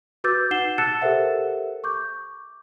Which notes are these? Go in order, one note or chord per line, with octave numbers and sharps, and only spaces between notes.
F#4 B4 D6 E6 G6 A6
D#4 F#5 C7 E7 G7
A5 E6 F#6 A6 C#7 E7
G4 A4 A#4 C5 E5 F#5
C#6 D6 G6